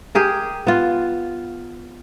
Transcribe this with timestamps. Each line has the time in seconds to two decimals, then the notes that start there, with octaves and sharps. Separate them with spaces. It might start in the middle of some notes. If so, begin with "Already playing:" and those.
0.15 G4 G#4 A#4
0.67 B3 F4